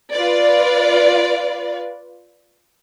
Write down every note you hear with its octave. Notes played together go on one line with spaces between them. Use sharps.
F4 B4 D5